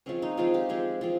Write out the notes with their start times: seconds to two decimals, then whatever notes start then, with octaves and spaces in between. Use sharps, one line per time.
0.06 F3 G#3 C4 C#4
0.22 D#4
0.37 F3 G#3 C4 F4
0.54 G4
0.69 F3 G#3 C4
1.01 F3 G#3 C4